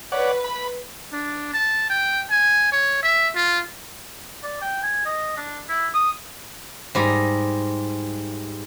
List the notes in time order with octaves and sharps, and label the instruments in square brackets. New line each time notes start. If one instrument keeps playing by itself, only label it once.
[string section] B4 [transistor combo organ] C#5 D5 F#5
[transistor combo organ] B5
[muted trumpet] D4
A5
G5
G#5
C#5
E5
F4
[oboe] D5
G5
G#5
D#5
D4
E4
D#6
[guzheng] G#2 G3 A#5